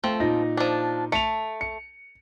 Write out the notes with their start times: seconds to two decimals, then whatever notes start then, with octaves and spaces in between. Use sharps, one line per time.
0.04 F3 A3 C4
0.20 A#2 D#4 A#6
0.57 F3 D4
1.12 A3 C#7 F7
1.61 C#7